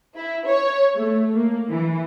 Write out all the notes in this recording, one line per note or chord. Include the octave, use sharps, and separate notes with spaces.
E4
C#5
A3
A#3
E3